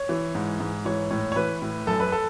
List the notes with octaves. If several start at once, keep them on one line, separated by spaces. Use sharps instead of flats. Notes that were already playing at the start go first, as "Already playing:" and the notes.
Already playing: C#5
E3
G#2
G#2
E3 C#5
A2 C#5
C#5
E3 B4
A2
F#2 A4
B4
A4